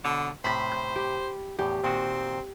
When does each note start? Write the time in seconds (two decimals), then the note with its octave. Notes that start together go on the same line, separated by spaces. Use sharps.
0.04 B2 D3 C#5 A5
0.44 A2 C3 C5 B5 B6
0.72 G6
0.96 G4
1.59 E2 A2 G4
1.84 A#2 D#3 C4 F#4